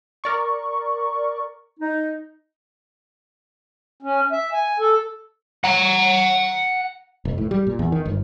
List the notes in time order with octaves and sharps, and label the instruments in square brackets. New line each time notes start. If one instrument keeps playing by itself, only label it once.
[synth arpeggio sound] A#4 D5 C#6
[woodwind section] D#4
[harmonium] C#4
E5
G#5
A4
[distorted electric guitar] F#5 A#5
[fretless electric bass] F1
A2
G3
A#2
E2
D#3
G1